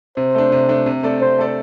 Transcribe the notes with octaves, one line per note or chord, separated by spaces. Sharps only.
C3 C5
A3 D4
C3
A3 D4
C3
A3 C4 A4 D5
C3 C5
A3 C4 A4 D5